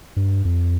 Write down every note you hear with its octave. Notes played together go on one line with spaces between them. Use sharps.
G2
F2